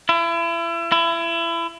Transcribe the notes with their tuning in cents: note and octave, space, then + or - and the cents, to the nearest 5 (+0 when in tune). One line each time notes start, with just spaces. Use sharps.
E4 +35
E4 +30